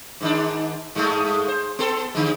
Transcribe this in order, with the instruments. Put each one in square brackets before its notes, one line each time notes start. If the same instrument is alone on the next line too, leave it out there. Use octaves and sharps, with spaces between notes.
[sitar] G#2 D#3 D4
G2 G#3 A3
C5
B3 A4
D#2 D3 G#3